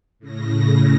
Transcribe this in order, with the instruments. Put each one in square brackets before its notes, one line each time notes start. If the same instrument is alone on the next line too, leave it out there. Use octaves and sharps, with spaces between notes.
[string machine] A2 C#3 A#6